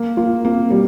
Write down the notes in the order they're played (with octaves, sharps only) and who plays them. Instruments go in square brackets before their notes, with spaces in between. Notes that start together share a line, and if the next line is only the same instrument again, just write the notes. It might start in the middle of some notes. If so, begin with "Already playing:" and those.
Already playing: [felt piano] A#3
[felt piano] A#3 [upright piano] F4
[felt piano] A#3 [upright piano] C4
[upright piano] B2 [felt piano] G3